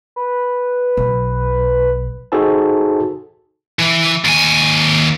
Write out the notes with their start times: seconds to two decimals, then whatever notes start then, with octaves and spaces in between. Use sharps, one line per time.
0.16 B4
0.97 B1
2.32 D#4 F#4 G#4 A4 C5 A5
3.79 E3
4.25 D#2 G#5